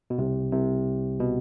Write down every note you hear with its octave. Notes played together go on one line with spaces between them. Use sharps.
B2
C2 C3
C2 C3
B2